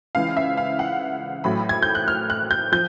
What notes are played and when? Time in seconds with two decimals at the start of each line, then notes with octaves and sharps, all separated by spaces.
0.15 C#2 C#3 E3 F5
0.37 E5
0.57 F5
0.79 F#5
1.44 A1 A2 F#3 B5
1.69 G#6
1.83 G6
1.95 F#6
2.08 F6
2.30 F#6
2.51 G6
2.72 F3 G6